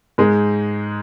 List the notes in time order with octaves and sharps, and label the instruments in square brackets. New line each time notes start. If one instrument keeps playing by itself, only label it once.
[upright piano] G#2 G#3